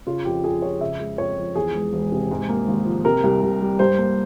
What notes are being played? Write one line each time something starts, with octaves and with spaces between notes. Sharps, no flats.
C#3 F4
F2 G4
F2 G#4
F3 C#5
C#3 E5
G#3
F2 C#5
F3
E2 G#4
E1
E1
C3
G#2
A#3
G#1
F3
C3 A#4
C2
C2
G3
G2 C5
A#3